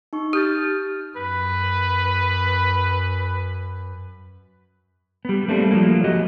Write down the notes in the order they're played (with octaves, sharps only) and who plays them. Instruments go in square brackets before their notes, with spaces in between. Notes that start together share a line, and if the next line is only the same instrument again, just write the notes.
[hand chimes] D#4 C#6
[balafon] G4 [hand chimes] F6 G6 A6
[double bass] F#2 [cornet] B4
[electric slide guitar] G3 B3
G3 A3 A#3 C4 D4
F3 F#3 A3 A#3
F3 F#4 G4 D#5